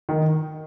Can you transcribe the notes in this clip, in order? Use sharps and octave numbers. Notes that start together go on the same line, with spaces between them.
D#3